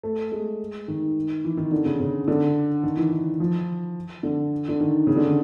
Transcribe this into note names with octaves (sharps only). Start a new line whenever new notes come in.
A3
G#3
D#3
E3
D#3
D3
C#3
C#3
D3
D#3
E3
D#3
F3
D3
D3
D#3
C#3
D3
D#3